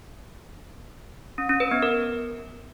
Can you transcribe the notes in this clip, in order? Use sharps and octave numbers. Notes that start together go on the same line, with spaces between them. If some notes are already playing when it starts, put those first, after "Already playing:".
C#4
C#4
B4
B3
A#4